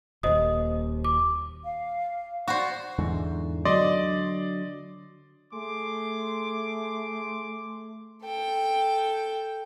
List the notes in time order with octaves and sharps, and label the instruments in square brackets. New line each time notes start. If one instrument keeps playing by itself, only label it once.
[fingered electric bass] D#1 D#2 [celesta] C5 D#5 D#6
[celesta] D6
[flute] F5
[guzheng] F#4 C5 [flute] D5
[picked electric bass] E2 G#2 D3
[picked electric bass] D3 F#3 [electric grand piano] D5 D#5 C6
[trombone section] A3 [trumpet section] G#4 C6 D6
[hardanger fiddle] A4 G5